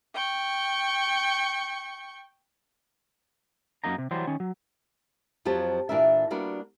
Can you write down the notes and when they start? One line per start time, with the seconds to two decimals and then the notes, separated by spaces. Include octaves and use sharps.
0.14 G5 C#6
3.84 F#2 A#3 D#4 A#5
3.98 C3
4.11 E3 F#3 G3 C5
4.27 D#3 C#4
4.40 F#3
5.45 F2 F3 F#3 G4 A5
5.89 A#2 E3 D4 A#4 E5
6.30 G3 A#3 B3 D4 F#4